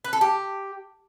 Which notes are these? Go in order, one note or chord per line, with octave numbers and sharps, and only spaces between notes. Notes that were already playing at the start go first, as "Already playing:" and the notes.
B4
A4
G4